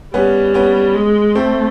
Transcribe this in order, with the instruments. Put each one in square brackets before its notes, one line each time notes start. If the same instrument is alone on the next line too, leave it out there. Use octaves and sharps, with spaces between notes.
[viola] G3 [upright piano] B3 C#4
[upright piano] B3 C#4
[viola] G#3
[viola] A3 [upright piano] C4